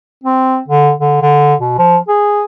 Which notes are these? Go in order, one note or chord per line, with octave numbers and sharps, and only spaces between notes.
C4
D3
D3
D3
B2
F3
G#4